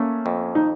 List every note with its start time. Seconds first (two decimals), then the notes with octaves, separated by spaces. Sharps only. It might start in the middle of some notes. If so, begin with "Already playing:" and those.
Already playing: A3 A#3 C#4
0.26 F2
0.55 D#4